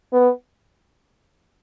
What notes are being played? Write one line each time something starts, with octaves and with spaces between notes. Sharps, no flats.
B3